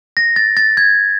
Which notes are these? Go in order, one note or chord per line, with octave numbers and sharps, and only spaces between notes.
A#6
A6
A6
G#6